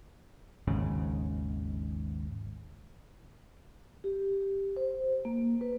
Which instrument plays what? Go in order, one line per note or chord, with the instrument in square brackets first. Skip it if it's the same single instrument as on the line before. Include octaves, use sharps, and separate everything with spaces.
[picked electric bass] G#1 D#2 G#2 C#3
[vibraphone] G4
C5
A#3
B4